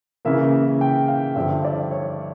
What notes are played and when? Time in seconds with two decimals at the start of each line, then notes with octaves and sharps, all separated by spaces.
0.25 C#3 E3 A#3 E5
0.81 G5
1.08 F5
1.36 G2 D3 F3 E5
1.64 D5
1.91 C#5